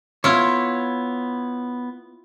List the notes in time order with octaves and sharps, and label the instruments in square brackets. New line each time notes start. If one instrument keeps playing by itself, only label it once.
[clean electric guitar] B3 C#5 [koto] E4 F4